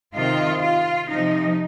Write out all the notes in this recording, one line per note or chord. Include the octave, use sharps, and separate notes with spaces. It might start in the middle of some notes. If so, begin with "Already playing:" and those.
C3 D#3 F4
F4
C3 F3 D#4